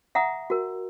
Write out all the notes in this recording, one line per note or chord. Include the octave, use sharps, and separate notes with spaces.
E5 F#5 A#5 D#6
F#4 A#4